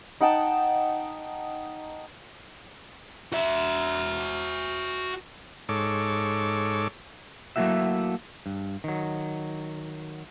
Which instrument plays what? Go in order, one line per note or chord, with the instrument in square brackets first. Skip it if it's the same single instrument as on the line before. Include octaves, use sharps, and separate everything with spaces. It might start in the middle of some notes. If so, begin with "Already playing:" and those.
[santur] D#4 F#5 G5 A5
[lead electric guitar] F#4 E5
[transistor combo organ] G#2 A4 C#5 D6
[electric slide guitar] F#3 A3 A#3 E4 F#4 E5
G2
D#3 F#3